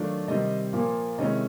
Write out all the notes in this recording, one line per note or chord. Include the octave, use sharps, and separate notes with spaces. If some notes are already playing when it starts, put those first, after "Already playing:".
Already playing: D#3 F#3 A3 D4 F4
C3 D#3 G3 C4 D#5
A#2 F3 A#3
C3 D#3 G#3 C#4 E4 D#5